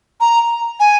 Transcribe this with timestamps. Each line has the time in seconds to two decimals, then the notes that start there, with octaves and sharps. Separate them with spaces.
0.21 A#5
0.80 G#5